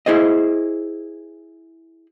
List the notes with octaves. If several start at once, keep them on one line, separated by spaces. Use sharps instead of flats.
E4 G#4 C5 D#5